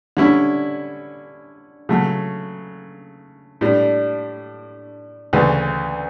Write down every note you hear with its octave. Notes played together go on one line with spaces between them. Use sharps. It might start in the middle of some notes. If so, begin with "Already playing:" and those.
D3 G3 C#4 E4
C#3 F#3 A3
A2 G3 D4
D2 C#3 E3